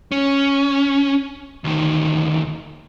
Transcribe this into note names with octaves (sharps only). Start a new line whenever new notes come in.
C#4
D2 D#3